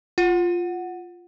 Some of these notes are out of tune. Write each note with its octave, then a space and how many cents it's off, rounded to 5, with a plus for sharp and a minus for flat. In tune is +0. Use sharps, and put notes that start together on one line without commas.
F4 +0 F#5 +0